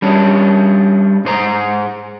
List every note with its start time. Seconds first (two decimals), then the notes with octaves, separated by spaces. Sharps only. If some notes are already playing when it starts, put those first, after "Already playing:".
0.02 G3 C#4 D4
1.25 G#2 C5 A#5